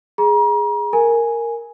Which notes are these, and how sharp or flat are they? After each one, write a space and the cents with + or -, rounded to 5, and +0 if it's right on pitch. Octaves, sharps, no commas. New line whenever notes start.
G#4 +0 A#5 +35
A#4 -5 G#5 +0